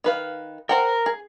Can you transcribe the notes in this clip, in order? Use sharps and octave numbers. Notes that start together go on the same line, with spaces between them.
D#3 B4 F5
A#4 C5 F#5 G5
G#4